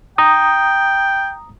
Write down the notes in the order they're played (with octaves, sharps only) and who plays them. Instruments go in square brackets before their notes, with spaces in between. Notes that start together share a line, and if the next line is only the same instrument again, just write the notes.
[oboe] G5 [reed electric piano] A#5 D#6